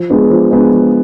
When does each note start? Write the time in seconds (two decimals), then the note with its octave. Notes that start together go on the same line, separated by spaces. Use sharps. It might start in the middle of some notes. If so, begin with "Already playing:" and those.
Already playing: F3
0.10 G#3 B3 D4
0.30 F3
0.51 G#3 B3 D4
0.72 F3